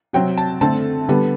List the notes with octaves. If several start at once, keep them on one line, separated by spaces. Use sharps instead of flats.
C3 F#3 C4 G5
A5
D3 A3 C4 A5
D3 G3 B3